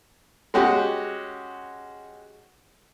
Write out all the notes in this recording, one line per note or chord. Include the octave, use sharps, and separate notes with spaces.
G#3 C#4 F#4 G4